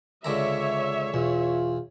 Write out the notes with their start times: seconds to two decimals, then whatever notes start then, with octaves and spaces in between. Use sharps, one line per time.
0.24 C#2 D3 C#5 E5 A#5
1.14 E2 B2 F4